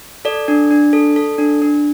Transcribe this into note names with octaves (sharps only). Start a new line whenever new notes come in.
A4 D5
D4
D4
A4
A4
D4
D4